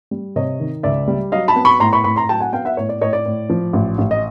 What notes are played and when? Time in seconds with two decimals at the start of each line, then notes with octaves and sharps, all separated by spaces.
0.11 G3
0.36 C3 C#5 D#5
0.60 D#3
0.83 C#2 D5 E5
1.08 G3
1.32 F#3 D#5 F5
1.48 A5 B5
1.56 B3
1.65 B5 C#6
1.80 A2 A#5 C6
1.93 B5 C#6
2.04 A2 B5 C#6
2.16 A#5 C6
2.29 F#3 G5 A5
2.40 F#5 G#5
2.52 B3 F5 G5
2.65 E5 F#5
2.77 A2 C#5
2.89 D5
3.01 A2 C#5 D#5
3.13 D5
3.26 A2
3.50 F3
3.73 A1
3.98 A1
4.11 D#5